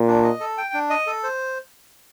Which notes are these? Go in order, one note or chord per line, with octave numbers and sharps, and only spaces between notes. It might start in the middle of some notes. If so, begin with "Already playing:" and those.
Already playing: A#2
D4
D#5
A4
G5
D4
D#5
A4
C5